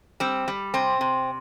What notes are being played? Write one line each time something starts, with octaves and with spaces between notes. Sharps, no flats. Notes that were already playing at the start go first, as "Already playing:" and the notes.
G3 C4
G3
C3 C4
C3